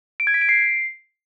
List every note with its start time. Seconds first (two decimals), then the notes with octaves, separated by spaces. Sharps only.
0.20 D7
0.27 G#6
0.34 B6
0.42 D7
0.49 C7